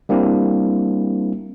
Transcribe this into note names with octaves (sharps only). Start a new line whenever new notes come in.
G3 A#3 C4 D4 E4